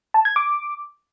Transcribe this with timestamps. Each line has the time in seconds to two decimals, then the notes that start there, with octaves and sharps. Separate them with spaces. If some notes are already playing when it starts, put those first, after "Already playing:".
0.14 A5
0.25 G#6
0.36 D6